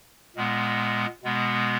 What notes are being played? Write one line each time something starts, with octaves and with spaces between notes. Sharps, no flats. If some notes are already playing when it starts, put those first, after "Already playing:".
A#2 G#3 B3
B2 G#3 B3